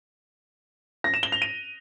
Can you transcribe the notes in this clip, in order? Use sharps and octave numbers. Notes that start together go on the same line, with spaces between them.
A#6
E7
G7
F7
D#7